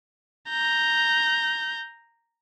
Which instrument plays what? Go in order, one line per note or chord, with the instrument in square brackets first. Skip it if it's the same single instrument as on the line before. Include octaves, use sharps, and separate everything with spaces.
[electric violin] A#5 G6